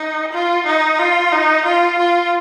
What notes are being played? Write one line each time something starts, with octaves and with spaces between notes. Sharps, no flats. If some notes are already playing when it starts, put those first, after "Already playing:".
Already playing: D#4
F4
D#4
F4
D#4
F4
F4